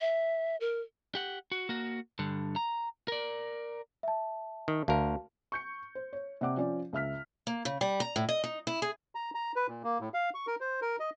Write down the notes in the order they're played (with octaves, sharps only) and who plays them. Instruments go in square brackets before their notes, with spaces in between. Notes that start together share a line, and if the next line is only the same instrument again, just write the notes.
[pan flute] E5
A#4
[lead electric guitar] G4 F#5
F#4
A#3 F#4
G2 D3
A#5
A#4 D5
[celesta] E5 A5
[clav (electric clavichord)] D#3
[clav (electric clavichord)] D2 A#4 [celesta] F#4 F5 A5
[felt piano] C#6 G6 C#7
C5
C#5
C3 D5 F#5 D6
F3 C#4 D5
C#2 E5 F6 B6
[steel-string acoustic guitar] A#3
C#3
G3
A#5
A2
D#5
D#4
E4
G#4
[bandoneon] A#5
A#5
B4
A#2
A#3
A2
F5
C#6
A#4
C5
A#4
D#5